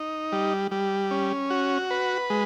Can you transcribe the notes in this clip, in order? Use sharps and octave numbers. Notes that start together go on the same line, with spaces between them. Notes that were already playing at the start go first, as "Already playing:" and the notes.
Already playing: D#4
G3
G3
C#4
F#4
B4
G#3